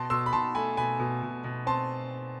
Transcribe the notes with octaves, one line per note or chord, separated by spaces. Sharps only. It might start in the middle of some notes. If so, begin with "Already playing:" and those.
Already playing: B2 A5 C6
B2 C6 E6
B5
B2 A5 C6
A3 G#5 B5
B2 G#5 B5
B2
B2
B2
C4 A5 C6